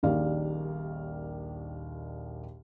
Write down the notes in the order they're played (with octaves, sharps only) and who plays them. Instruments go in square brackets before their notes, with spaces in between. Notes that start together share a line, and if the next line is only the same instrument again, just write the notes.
[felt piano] D#1 A#1 D#2 D#3 D5 F5